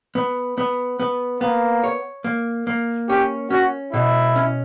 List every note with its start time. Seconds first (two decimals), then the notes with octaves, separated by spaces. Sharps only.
0.15 B3
0.58 B3
1.00 B3
1.40 A#3 B3
1.84 C#5
2.24 A#3
2.67 A#3
3.09 C#4 G4
3.51 C#4 F#4
3.92 B2 E4
4.36 C#4